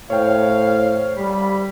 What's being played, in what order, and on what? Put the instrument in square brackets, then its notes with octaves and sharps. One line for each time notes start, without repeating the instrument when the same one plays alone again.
[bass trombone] A2 [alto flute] C5 [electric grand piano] C#5 G5 [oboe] F5
[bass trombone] G3 [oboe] B5